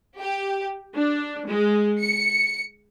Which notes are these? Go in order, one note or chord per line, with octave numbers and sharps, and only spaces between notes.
G4
D4
G#3
C#7